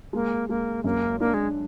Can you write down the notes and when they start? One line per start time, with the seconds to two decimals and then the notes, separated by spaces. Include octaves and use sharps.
0.13 G#3 A#3
0.49 G#3 A#3
0.84 F#2 A#3
1.20 A#3 D4
1.34 G#3